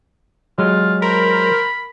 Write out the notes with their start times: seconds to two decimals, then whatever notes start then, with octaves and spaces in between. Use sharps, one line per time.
0.58 F#3 G#3 F4
1.02 A#4 C5 B5